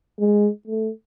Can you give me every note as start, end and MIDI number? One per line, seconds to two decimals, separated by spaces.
0.20 0.48 56
0.67 0.91 57